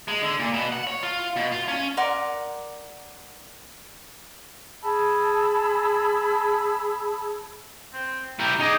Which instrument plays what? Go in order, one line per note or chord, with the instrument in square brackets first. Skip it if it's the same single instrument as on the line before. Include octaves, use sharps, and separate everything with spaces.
[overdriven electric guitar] G#3
D3
A#2
B2
F#5
C#5
F4
B2
F4
C#4
[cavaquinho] A#4 D5 F#5 C6
[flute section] G#4 A5 B5 E6
[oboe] C4
[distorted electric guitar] E4 A#4 [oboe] G4
[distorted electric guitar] D#4 D5 [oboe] G#4